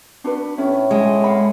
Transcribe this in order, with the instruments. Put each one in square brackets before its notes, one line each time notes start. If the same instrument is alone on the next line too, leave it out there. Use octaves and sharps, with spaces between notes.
[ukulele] D4 F#4 B4
[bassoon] A2 [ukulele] C#4
[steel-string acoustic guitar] G#3
[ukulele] F5 F#5 B5